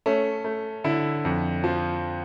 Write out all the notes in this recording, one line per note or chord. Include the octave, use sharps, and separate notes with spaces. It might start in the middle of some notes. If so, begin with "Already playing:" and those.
A3 C#4
A3
D3 E4
F2
F3